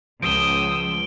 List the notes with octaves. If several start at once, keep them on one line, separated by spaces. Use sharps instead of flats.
C#2 F3 D#6 E6 D7 G7